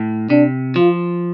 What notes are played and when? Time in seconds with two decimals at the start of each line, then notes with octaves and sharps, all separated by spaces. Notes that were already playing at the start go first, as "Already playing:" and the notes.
Already playing: A2
0.30 C3 D4
0.76 F3 F4